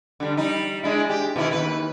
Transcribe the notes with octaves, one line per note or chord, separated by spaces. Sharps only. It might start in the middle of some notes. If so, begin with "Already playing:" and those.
D3 G3
G3 D#4
G#3 D4 E4
G4
B2 D#3 E4
D#2 B2 B4